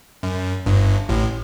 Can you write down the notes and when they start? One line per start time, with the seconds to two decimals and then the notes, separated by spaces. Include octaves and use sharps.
0.23 F#2
0.66 G1 G2
1.09 A1 A2